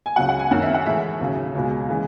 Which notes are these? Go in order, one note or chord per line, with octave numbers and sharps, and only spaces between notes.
G#5
C#2 C#3 F#3 F#5
F#5
G#5
F#2 D#3 F#3 F#5
E5
F#5
A2 E3 G#3 E5
D#2 C#3 F#3
C#2 B2 G#3
C#3 E3 G#3